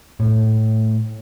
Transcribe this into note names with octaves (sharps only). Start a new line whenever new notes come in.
A2